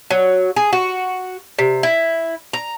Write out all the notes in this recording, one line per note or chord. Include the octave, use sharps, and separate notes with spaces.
F#3
G#4
F#4
C3
E4
A#5